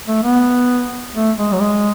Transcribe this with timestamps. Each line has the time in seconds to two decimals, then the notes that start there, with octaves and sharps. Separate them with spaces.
0.08 A3
0.24 B3
1.15 A3
1.38 G#3
1.52 F#3
1.61 G#3